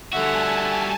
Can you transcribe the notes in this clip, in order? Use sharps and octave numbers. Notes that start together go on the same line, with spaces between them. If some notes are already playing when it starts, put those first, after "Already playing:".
D3 G3 F#4 E5 F#5 G#5 A5